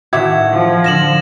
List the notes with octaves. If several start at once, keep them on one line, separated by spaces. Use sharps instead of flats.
A2 D#3 F#4 E5 D6 G#6
F3
D3 F4 A#6 E7 F#7